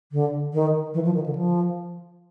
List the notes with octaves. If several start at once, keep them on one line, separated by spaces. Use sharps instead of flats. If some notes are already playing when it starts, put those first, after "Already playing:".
D3
D#3
E3
F3
D#3
D3
F3